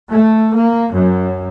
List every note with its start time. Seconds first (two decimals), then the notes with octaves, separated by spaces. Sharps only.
0.11 A3
0.55 A#3
0.93 F#2